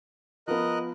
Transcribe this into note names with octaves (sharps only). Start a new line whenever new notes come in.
F3 B3 A#4 D#5 F#6